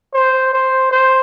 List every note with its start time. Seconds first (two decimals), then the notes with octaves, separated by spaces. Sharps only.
0.14 C5
0.53 C5
0.91 C5